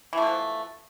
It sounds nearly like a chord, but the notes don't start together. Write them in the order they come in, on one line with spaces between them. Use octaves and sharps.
E3 A3 B2 F3